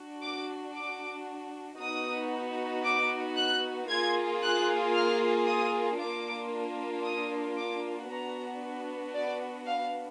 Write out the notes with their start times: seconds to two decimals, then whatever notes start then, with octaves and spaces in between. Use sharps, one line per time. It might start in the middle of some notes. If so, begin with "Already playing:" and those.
Already playing: D4 F#4
0.22 D6
0.74 D6
1.79 B3 D#4 F#4 D#6
2.84 D6
3.36 F#6
3.89 A#3 F4 G#4 G#6
4.42 F#6
4.94 F6
5.46 D#6
5.98 A#3 D4 F4 D6
7.04 D#6
7.57 D6
8.09 B3 D4 F#4 A#5
9.14 D5
9.66 F5